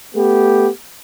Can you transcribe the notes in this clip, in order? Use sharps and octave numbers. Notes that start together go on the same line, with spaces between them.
A3 B3 G4